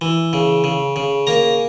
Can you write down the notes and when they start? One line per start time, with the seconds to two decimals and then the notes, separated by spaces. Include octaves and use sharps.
0.01 E3
0.33 C#3
0.64 C#3
0.96 C#3
1.27 A#3 A#5